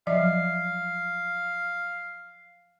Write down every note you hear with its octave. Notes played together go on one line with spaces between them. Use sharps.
F3 F#3 E5 F5